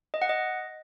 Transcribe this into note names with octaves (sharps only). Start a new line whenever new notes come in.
D#5
F#5
D#5